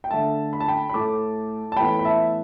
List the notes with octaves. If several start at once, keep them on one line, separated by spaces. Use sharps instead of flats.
G5
D3 A3 E5 A5
B5
A5
G5 B5
B5
A2 A3 A5 D6
A5
A2 E3 B3 G5 B5
B5
E5 A5